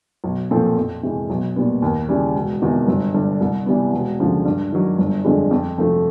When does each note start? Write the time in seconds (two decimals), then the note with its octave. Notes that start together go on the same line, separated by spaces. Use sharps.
0.24 B1
0.51 A#2 F3 A3 C4
0.76 F2
1.03 C3 E3 G#3
1.30 B1
1.56 A#2 G3 B3
1.82 D#2
2.08 C#3 E3 G3
2.35 E1
2.62 E2 C3 D#3
2.88 G1
3.14 G2 D3
3.41 C2
3.66 C3 E3 G3 B3
3.93 E1
4.20 D2 C#3 F3
4.45 G2
4.72 D#3 F#3
4.98 G1
5.25 F2 D3 F3 G#3
5.51 F2
5.78 C3 F3 A3